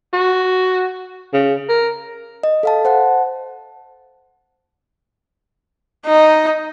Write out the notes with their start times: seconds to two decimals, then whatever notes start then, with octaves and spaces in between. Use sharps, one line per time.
0.13 F#4
1.33 C#3
1.69 A#4
2.43 D#5
2.63 A4 F5 A5
2.85 C5 F#5 A5
6.06 D#4